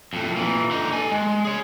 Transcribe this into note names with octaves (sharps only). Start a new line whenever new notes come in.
F2 A2
A#2 E3
D3 D#4
A4 G#5
G#3
G#4 C#5